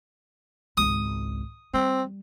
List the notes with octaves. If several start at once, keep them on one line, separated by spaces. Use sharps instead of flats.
G#1 C#2 D#6
G3 C4